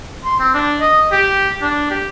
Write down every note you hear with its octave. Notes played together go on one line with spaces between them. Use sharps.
C6
C4
D4
D#5
G4
D4
G4